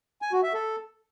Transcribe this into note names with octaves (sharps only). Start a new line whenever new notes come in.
G#5
F#4
E5
A4